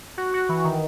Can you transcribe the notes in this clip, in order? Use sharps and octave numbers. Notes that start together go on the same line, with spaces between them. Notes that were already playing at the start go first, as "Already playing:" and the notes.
F#4
F#4
E3
D#3